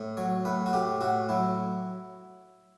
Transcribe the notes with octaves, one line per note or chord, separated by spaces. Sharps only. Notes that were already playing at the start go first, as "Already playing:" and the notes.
Already playing: A2
F#3 C#5
A2 B4
F#4
A2 G4
A2 F#4
F#3 E4